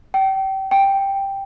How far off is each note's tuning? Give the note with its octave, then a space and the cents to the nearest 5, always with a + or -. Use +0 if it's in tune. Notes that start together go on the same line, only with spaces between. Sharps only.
G5 -30
G5 +5